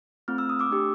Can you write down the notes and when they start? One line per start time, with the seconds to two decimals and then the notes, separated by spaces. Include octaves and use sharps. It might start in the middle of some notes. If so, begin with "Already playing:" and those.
0.28 A3 C4 F4 F6
0.38 E6
0.49 D#6
0.59 D6 E6
0.70 A3 D4 G4